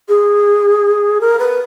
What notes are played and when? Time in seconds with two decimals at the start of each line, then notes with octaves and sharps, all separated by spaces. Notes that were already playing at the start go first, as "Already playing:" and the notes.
0.08 G#4
1.20 A#4
1.39 B4